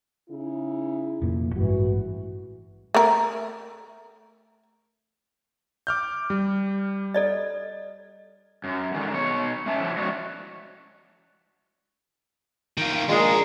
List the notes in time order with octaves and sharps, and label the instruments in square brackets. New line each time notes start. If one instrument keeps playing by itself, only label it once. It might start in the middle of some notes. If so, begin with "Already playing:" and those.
[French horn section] C#3 D#4 E4
[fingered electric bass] F1 A#2
[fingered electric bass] A1 G2 G#3 [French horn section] E3 F#4
[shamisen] A3 A#4
[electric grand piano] D6 F6 G6
G3
[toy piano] A4 D5 D#5
[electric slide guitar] F#2
D3 D#3 G#3
B2 C#5
A3 C#4 E5 A5
F3 F#3 E4
F#3 G#3 C#4 F#4 C#5 D5
[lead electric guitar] D#3 F4
[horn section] A#2 G#3 [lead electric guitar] D4 A#4